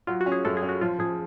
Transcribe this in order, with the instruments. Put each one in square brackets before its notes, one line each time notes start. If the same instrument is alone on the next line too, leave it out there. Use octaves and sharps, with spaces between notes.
[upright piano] F#3 [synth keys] F4
[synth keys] F#4
[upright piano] C#4
[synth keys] G#4
[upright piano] F#2 [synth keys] A4
[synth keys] G#4
[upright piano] C#4
[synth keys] F#4
[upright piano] F3 [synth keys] F4
[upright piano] F3 [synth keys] G#4